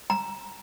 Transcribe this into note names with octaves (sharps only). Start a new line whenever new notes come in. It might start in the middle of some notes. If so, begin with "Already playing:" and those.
A#5